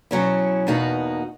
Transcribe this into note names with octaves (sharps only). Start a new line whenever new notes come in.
B2 F#3 C#4 E4
E2 B2 A#3 D#4 F#4